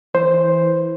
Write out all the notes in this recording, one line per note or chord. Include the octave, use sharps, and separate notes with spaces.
E3 C5